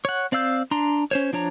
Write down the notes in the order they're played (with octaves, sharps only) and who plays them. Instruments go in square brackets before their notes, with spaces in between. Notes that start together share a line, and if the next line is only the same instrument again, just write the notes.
[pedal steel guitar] C#5 F#5
C4 D5 F5 E6 G6
D4 A#5 C6
C#4 C5 C#5
F3 D4 C#5 A#5